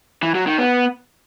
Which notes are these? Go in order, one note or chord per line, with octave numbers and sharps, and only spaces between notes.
E3
F#3
D#3
B3